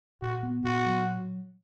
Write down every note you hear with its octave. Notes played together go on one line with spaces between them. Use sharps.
A#2 F#4
B3
A#2 F#4
F#3